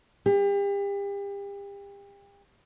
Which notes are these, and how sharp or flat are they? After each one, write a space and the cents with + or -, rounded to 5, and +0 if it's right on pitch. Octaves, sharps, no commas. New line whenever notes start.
G4 +35